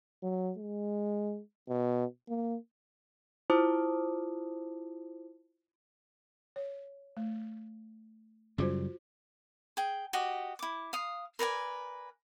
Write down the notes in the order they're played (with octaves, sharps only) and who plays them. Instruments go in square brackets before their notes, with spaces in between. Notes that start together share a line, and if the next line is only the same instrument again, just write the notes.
[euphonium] F#3
G#3
B2
A#3
[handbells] E4 F4 C5 A5 D6 D#6
[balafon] C#5
A3
[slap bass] F#2 C#3 G3 [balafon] F4 F#4 C5
[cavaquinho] G#4 G5
F#4 G4 D#5
E4 D6
F5 D#6
A#4 B4 D5 G#5